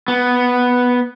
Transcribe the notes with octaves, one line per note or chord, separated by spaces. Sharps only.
B3